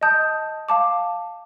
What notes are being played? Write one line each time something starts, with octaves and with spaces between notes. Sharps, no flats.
D#5 A5 D#6 G6
F5 A5 D6